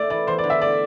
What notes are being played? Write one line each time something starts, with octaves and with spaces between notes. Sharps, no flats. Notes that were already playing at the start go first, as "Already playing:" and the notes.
Already playing: A3 D5
E3 D5
E2 C5
D5
D3
E5
A3 D5